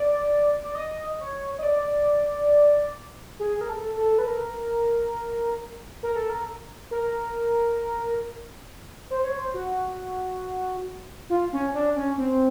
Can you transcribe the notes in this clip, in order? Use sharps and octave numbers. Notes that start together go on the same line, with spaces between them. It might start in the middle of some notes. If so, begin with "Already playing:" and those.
Already playing: D5
D5
D#5
C#5
D#5
D5
G#4
A#4
A4
A4
B4
A#4
A#4
A4
A#4
A#4
C5
C#5
C5
F#4
F4
C#4
D4
C#4
C4